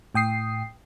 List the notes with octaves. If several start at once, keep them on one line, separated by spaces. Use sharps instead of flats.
A2 G5 D#6 C7